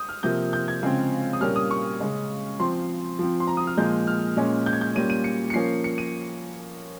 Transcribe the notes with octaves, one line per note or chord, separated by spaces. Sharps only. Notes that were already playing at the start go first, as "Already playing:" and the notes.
Already playing: D#6 G6
F6
C3 F3 A#3 G6
G6
G#6
C#3 F3 G#3 C4
D#6
A#2 G3 A#3 C#4 F6
D#6
C#6
C#3 G#3 C#4
F3 C4 C6
F3 C4
C6
A#5
D#6
F6
A#2 F3 G#3 G6
F6
A#2 G#3 C#4
G6
G#6
G6
A#2 G3 A#3 C#4 D#7
D#7
C#7
C#7
F3 A#3 C#4 C7
C#7
D#7